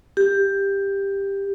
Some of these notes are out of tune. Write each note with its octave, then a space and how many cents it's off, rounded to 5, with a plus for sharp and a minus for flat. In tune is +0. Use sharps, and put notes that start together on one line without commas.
G4 +10